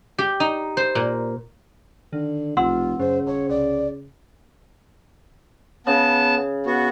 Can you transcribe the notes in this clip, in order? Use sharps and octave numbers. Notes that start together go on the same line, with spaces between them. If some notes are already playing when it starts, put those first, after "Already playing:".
G4
D#4
C5
A#2
D3 D#3
F1 B1 F4 F#5 C6 E6
F#2 C#3 C5
D#1 C#5
C2 D5
C#3 B3 A5
B3 F#4